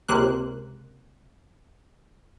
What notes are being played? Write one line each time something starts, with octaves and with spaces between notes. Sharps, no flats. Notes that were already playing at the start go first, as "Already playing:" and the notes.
C#2 C3 A#3 F#6